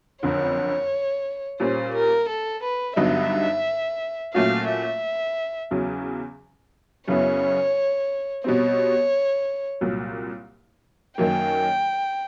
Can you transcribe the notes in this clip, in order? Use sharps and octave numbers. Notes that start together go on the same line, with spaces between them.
F#1 F2 D3 C#5
A#2 G3 A#3 C#4 C5
A#4
A4
B4
G2 D3 F#3 B3 D#4 E5
A#2 F#3 A3 C#4 F#4 F5
E5
E2 C#3 F#3
F#2 C#3 F#3 B3 E4 C#5
B2 G3 C4 C#5
C2 A#2 F#3
F#2 D#3 F#3 A#3 G5